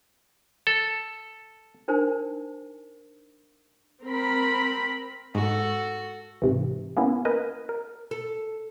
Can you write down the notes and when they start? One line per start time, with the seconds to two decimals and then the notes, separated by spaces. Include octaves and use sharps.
0.67 A4
1.88 D4 D#4 A#4 C5 G#5 A5
4.04 C4 A#4 B5
5.35 G#2 F#4 A4
6.42 G#2 C3 E3
6.97 A#3 B3 C#4 E4
7.25 A#4 B4 D#5 G#5
7.69 A#4
8.11 A4